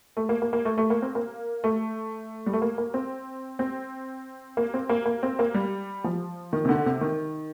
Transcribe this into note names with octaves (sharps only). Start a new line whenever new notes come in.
A3
A#3
A#3
A#3
A3
A3
A#3
C4
A#3
A3
G3
A3
A#3
A#3
C4
C4
A#3
C4
A#3
A#3
C4
A#3
G3
F3
D#3
C3
D3
C3
D#3